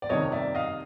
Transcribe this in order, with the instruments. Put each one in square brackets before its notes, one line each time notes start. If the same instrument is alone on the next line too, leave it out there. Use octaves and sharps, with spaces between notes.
[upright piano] D5
F2 C3 D#3 G3 C#5 D#5
D5 E5
D#5 F5